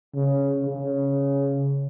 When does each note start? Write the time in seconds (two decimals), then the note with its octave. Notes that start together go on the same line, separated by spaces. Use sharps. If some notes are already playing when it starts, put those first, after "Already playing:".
0.15 C#3
0.66 C#3